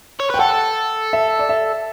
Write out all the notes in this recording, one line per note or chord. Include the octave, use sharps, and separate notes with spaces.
C#5
B4 G5
A4 F#5
E5
D5
E5